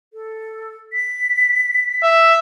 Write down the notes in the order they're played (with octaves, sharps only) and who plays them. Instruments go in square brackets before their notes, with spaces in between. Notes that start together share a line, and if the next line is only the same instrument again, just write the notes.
[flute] A4
B6
[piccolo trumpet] E5